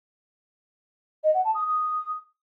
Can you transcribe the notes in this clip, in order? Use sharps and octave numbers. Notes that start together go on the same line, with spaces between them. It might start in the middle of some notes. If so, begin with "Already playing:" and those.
D#5
F#5
A5
D#6
D#6